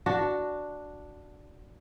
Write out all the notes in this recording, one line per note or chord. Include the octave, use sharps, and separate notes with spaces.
D4 F#4